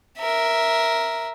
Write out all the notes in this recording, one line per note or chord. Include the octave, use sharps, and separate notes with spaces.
A#4 E5